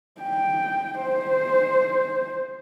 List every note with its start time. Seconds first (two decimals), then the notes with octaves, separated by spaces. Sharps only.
0.21 G5
1.02 C5